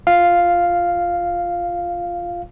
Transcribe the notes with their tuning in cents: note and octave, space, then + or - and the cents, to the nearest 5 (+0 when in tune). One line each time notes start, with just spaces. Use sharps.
F4 +0 F5 +0